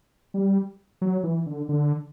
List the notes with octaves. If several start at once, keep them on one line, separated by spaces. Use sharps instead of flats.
G3
F#3
E3
D3
D3